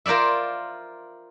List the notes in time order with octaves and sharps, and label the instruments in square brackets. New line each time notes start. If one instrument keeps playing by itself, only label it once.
[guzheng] F4 A#4 C5 D5 E5